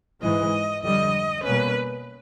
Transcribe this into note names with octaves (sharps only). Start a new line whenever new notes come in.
G#2 E3 G#3 D#5
F2 D3 G3 D#5
B2 G3 A#3 C#4 B4